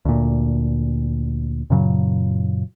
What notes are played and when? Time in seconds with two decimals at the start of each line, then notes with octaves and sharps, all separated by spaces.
0.05 D2 A#2
1.70 F#2 A#2 C#3 F#3